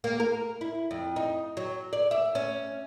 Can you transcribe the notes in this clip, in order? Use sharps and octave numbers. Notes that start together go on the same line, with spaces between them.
A#3
A#4
E4
F2
D#4
F#3
D5
E5
C#4